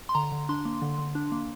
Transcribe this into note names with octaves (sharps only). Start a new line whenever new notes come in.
C6
D3 A#5
D3
D4 C6
A#3
D3
D3
D4
A#3